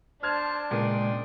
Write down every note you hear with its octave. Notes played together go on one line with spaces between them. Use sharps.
D4 C5 A5 F6 G#6
A#2 C#3 G#3 G5 C6 D#6